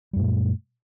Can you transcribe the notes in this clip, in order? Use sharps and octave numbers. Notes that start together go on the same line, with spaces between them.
F#2 A#2 G3 A3